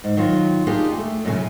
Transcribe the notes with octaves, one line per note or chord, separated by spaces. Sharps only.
G#2
D#3 F#3 F4
A#3 D4 D#4 F4 G4 G#4
A3
F#2 A#2 C#3 G#5